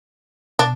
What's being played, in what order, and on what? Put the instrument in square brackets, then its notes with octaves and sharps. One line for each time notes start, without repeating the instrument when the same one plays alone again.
[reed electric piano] B2 [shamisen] D4